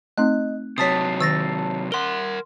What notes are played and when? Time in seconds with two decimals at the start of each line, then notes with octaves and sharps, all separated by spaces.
0.18 A3 C4 D#4 D#5 F#6
0.78 C3 F#3 C#5 A5 D#6 A6 B6 C7
1.21 D#3 E6 A6 A#6
1.92 A#4 F#5 C6 G7